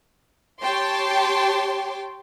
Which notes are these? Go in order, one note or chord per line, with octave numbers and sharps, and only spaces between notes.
G4 C#5 G5 A5 C6 D6